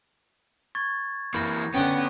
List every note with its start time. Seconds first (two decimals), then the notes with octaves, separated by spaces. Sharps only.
0.75 C#6 G#6 A6
1.34 E3 A#3 B5 G6 A#6
1.74 D3 B3 C#4 F#5 G5